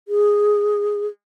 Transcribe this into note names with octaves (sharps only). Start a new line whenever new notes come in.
G#4